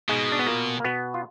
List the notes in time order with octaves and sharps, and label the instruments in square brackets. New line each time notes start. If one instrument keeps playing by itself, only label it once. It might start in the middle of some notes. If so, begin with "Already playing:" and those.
[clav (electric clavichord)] G#2 G#3 [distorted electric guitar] B2
[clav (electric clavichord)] D4
B3
A#2 A#3
A#3
B2 B3
F4